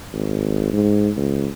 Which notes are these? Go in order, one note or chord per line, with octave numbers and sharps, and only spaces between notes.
G#1
G#2
C#2